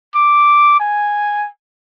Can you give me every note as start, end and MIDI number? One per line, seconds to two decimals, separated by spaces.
0.15 0.76 86
0.80 1.47 80